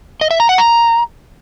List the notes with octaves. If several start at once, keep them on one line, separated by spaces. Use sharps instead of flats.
D#5
E5
A#5
F#5
A#5